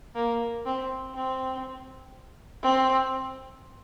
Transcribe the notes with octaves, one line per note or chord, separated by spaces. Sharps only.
A#3
C4
C4
C4